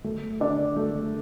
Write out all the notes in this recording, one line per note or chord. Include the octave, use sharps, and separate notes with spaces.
A3
D4 A4 D5
A3